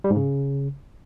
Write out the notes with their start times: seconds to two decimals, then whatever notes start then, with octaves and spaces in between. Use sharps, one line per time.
0.04 G3
0.10 G#2
0.16 C#3